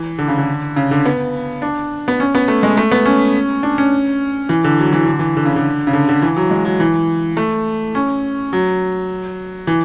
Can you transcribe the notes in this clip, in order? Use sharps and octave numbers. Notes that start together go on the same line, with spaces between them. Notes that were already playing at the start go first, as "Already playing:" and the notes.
Already playing: E3
D3
C#3
D3
C#3
D3
B3
D4
B3
C#4
B3
A3
G#3
A3
B3
C#4
D4
C#4
E3
D3
F#3
E3
D3
E3
D3
C#3
D3
C#3
D3
D3
E3
F#3
G#3
F#3
E3
A3
C#4
F#3
E3